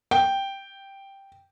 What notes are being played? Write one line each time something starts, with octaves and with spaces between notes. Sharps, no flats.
G5